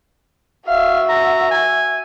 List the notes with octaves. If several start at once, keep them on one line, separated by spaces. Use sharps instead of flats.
F#4 E5 F5
A#5
G#5